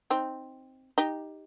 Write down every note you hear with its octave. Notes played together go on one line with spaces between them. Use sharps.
C4 D#4
D#4 G4